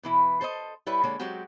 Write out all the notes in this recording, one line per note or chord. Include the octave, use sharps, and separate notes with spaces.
B2 E3 E4
A4 C5 D5 D#5
G3 E4 B4 C#5
D3 G#3 A#3 C#5
F#3 G#3 C4 F#4 G4